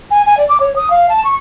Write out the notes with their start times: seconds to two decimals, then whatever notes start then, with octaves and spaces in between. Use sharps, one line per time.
0.10 G#5
0.26 G#5
0.37 D5
0.48 D6
0.60 C#5
0.76 D#6
0.90 F5
1.09 A5
1.24 C#6